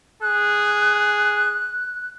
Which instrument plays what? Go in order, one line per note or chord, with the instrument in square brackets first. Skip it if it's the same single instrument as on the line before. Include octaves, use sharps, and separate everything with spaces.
[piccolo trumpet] G#4 [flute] F#6